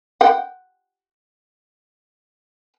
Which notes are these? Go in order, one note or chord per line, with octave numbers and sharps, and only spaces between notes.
F#5 G5